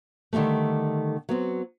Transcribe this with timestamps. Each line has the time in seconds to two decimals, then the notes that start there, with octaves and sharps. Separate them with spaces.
0.33 D3 D#3 F3 G3 A3
1.29 F#3 B3 C4